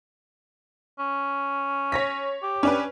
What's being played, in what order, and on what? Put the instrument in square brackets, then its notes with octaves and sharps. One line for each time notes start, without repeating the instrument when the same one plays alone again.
[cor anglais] C#4
[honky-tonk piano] C#5 A#6 B6
[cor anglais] G4
[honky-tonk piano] C#4 D4 B4